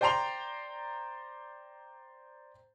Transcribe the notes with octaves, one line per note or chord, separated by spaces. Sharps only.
C5 D5 G5 A#5 C6 F7